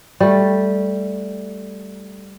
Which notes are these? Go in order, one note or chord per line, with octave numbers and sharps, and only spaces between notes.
G3 A3